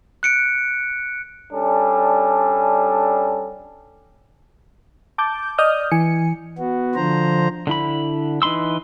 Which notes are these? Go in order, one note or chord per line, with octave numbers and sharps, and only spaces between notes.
F#6 C#7 D7
G3 C#4 D4 A4
A5 D6 G6
D5 D#5 D#6 F6 G6
E3 G#5 C#7
B3 F#4
D3 F3 C5 A#5
D3 E4 B5
E3 D#4 B5 C6 E6